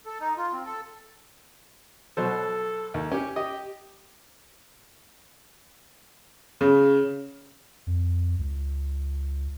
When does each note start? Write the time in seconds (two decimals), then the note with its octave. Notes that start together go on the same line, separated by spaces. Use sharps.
0.06 A4
0.20 D#4
0.37 F4
0.53 C4
0.66 A4
2.17 B2 F#3 A4 C5
2.94 D#2
3.12 C#4 G4
3.36 G4 D#5
6.61 C#3
7.87 F2
8.39 C#2